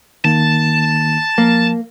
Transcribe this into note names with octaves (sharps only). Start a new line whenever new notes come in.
D#3 A#3 A5
F3 A#3